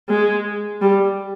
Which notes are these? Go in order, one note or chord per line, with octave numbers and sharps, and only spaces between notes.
G#3
G3